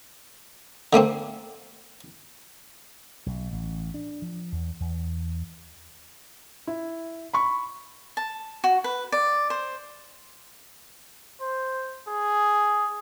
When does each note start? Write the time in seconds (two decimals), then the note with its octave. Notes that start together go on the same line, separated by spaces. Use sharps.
0.93 D3 A3 A#3 C4
3.26 B1
3.53 A1
3.94 D4
4.22 F3
4.52 E2
4.80 E2
6.67 E4
7.33 B5 C#6
8.17 A5
8.64 F#4
8.84 B4
9.12 D5
9.50 C5
11.42 C5
12.09 G#4